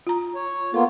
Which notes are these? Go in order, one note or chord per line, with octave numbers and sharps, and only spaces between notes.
F4 A#5
C#5
A#3 B3 F4 A4